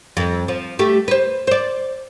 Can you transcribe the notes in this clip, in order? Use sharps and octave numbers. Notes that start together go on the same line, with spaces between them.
F2
F3
A3 G4
B4 C5
C5 D5